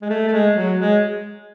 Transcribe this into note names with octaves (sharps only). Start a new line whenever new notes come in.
G#3
A3
A3
G#3
F#3
G#3